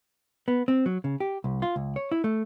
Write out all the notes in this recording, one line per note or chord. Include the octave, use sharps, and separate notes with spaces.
B3
C4
F#3
C#3
G4
C2
F4
C#2
C#5
E4
A3